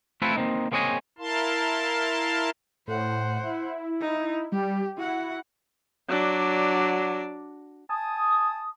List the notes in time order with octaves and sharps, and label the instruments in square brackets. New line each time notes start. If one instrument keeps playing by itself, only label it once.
[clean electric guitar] A3 C4 E4 F4 A4 B4
A#3 C4 D#4
A#3 C4 G#4 C#5 D#5 G#5
[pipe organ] E4 A#4 F5 A5 C6
[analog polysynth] A2 [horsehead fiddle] C5 F#5
[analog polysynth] E4
[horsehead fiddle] D#4
[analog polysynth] G3 [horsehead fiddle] G4
[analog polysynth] E4 [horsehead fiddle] F#4 F#5
[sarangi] F#3 [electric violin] D4 D5
[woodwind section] G#5 A5 D#6